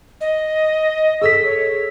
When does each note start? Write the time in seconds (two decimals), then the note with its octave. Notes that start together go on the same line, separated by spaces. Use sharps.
0.21 D#5
1.22 G#4 A4 E6 B6
1.44 C#5